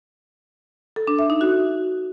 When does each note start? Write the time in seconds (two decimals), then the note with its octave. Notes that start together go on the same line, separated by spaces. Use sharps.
0.96 A4
1.07 D4
1.19 E5
1.30 D#4
1.41 F#4